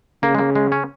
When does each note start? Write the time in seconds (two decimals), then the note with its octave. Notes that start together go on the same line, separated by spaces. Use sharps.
0.23 C#3 A#3
0.35 G#3
0.39 A#3
0.55 G#3
0.72 C#4